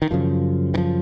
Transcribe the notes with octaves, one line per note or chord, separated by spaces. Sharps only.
D#3
F#2 C#3 F3
D#3
F3